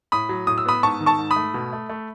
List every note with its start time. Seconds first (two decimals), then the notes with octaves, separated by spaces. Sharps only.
0.12 A2 B5 D#6
0.29 F#3
0.47 A2 D#6
0.58 E6
0.66 B3 B5 D#6
0.83 G#2 A5 C#6
1.00 D#3
1.06 A5 C#6
1.18 G#2
1.31 B5 D#6
1.36 A3
1.54 B2
1.73 A3
1.89 A3